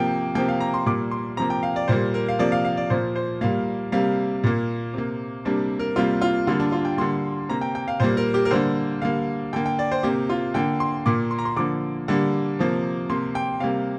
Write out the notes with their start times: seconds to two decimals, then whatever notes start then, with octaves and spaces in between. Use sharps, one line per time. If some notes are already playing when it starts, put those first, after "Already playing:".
Already playing: C3 F3 A#3 G5
0.35 C3 F3 A#3 G5
0.48 F5
0.60 A#5
0.74 C6
0.86 A#2 G3 A#3 D6
1.11 C6
1.37 C3 F3 A#3 A#5
1.50 G5
1.63 F5
1.76 D5
1.88 A#2 G3 A#3 C5
2.14 A#4
2.28 F5
2.39 C3 F3 A#3 D5
2.52 F5
2.65 F5
2.77 D5
2.90 A#2 F3 A#3 C5
3.16 C5
3.41 A#2 G3 A#3 F5
3.92 C3 G3 A#3 F5
4.44 A#2 A#3
4.93 C3 A#3
5.45 C3 G3 A#3 D4
5.79 A#4
5.96 C3 G3 A#3 F4
6.21 F4
6.47 D3 G3 A#3 F4
6.60 D4
6.72 F4
6.85 G5
6.98 D3 G3 A#3 C6
7.49 C3 A#3 A#5
7.61 G5
7.75 G5
7.88 F5
8.00 A#2 G3 A#3 C5
8.17 A#4
8.34 G4
8.45 A#4
8.51 D3 G3 A#3 C5
9.02 D3 G3 A#3 F5
9.53 D3 A#3 G5
9.66 G5
9.79 D5
9.92 C5
10.03 C3 A#3 G4
10.29 F4
10.54 D3 A#3 G5
10.80 C6
11.06 A#2 A#3 D6
11.31 C6
11.39 A#5
11.45 C6
11.56 D3 F3 A#3 D6
12.08 D3 G3 A#3
12.59 C3 F3 A#3
13.09 C3 A#3 C6
13.35 G5
13.60 C3 G3 A#3 F5